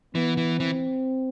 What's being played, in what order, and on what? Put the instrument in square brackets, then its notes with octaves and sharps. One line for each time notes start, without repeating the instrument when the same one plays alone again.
[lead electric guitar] E3 [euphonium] B3
[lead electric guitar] E3
[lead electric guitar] E3 [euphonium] C4